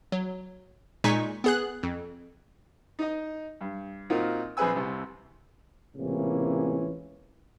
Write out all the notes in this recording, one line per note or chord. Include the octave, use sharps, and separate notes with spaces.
F#3
A#2 G#3 D#4 G#5 C#6 B6
B3 G#4 F#6
F2
D#4 D#5
G2
A#2 C4 D#4 F4 F#4 A#4
A#1 C4 G#4 B4 G#5 E6
C2 C3
C#2 A2 C3 E3 A#3 C#4